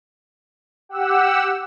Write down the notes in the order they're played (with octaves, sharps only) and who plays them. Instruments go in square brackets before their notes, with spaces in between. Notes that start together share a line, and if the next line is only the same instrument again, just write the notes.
[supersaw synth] G4 F#5 E6